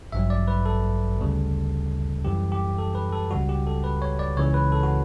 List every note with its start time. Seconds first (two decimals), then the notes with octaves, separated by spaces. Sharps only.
0.12 A1 G2 F#3 E5
0.30 D5
0.48 B4
0.66 A4
1.19 D2 C#3 G3
2.24 F#2 E3 G3 G4
2.52 G4
2.78 A4
2.95 B4
3.13 A4
3.31 C#2 C#3 G3 F#4
3.49 G4
3.67 A4
3.84 B4
4.02 C#5
4.19 D5
4.37 C#2 C#3 E3 C#5
4.54 B4
4.72 A4
4.83 F#4